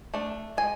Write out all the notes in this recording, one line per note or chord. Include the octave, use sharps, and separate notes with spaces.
A3 D4
G#3 G#5